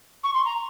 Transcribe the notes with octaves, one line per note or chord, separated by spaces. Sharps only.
C#6
C6
A#5